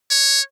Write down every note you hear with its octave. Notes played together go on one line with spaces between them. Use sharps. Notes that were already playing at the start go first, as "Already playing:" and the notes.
C#5